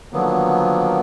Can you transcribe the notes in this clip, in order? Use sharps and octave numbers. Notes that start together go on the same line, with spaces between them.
D3 D#3 F3 F#3 A#3 B3